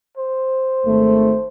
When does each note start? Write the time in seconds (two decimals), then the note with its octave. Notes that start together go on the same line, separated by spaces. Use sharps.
0.17 C5
0.85 G#1 A3